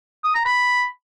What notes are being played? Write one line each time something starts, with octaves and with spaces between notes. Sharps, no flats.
D#6
A#5
B5